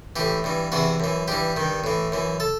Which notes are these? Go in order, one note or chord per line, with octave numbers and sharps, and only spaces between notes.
A2 E3 G4
G2 E3
E2 C3 E3 F#4
F#2 E3
G2 E3 G4
G2 D#3
A2 E3
F#2 E3
A4